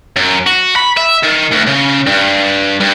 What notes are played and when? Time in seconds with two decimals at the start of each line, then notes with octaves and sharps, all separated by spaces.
0.16 F#2
0.47 F#4
0.76 B5
0.97 E5
1.23 D#3
1.51 D2
1.67 C#3
2.07 G2
2.80 G2